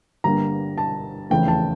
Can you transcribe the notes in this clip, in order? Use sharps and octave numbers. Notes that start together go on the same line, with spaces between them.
G1 G2 D3 G3 A#3 A#5
A5
F1 E2 C#3 E3 A3 G5
A5